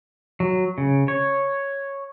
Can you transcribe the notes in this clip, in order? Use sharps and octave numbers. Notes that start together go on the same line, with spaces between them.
F#3
C#3
C#5